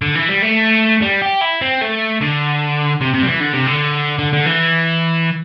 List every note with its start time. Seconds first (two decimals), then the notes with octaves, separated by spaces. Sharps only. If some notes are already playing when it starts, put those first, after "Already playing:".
0.02 D3
0.15 E3
0.29 G3
0.42 A3
1.02 G3
1.22 G4
1.41 E4
1.61 C4
1.81 A3
2.21 D3
3.01 C3
3.14 C3
3.22 G3
3.26 E3
3.40 D3
3.53 C3
3.67 D3
4.19 D3
4.33 D3
4.46 E3